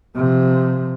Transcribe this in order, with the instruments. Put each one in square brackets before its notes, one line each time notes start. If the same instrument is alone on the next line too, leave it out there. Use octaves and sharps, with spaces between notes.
[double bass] C3 F3